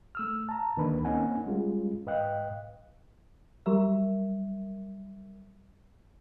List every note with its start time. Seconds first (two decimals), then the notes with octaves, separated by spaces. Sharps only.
0.15 A3 E6 F6
0.49 A5 A#5
0.77 D2 D#3 A#3 D4 B4 B5
1.05 A#3 C4 C#4 D#4 F#5 G#5
1.46 G3 G#3 C#4 F4 G#4
2.06 G#2 B4 D#5 F5 G5 F#6
3.66 F#3 G3 A#4 E5